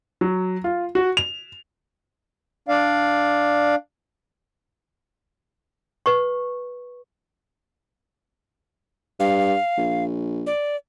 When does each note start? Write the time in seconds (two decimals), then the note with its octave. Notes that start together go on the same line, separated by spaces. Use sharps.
0.21 F#3
0.64 F4
0.95 F#4
1.17 F7
2.69 D4 D5 F5
6.06 B4 C#6
9.20 G2 F5
9.78 A#1
10.46 D5